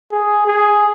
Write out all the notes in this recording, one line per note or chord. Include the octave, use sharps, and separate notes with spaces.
G#4
G#4